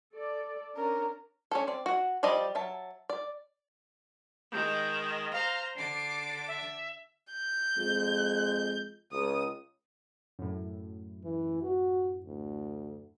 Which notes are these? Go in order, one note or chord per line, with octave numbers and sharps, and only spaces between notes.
A4 D5
C#4 D4 A#4
C#4 D4 A4
C4 D5
F#4 F#5
F3 G3 D5 D#5
F#3 E5 A5
D5
D#3 G#3 G6
C5 F5 A#5
D3 D4 D6 C7
E5
G6
F2 G#3
C#2 D#6
F#2 A2
E3
F#4
D2